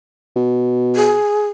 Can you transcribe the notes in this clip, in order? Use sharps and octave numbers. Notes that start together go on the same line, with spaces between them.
B2
G#4